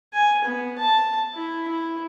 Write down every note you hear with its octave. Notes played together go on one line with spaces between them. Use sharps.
G#5
B3
A5
E4
E4